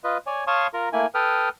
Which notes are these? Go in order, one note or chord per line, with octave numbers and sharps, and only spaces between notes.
F4 B4 D#5
C#5 D5 G#5
C#5 F5 A5 C6 C#6 D#6
F4 A#4 A#5
A3 A#3 E4 G#5
A4 B4 G5 D#6 F6